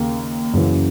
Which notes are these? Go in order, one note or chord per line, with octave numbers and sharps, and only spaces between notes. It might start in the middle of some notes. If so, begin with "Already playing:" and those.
Already playing: D#2 C#3 A#3
F#2 C#3 E3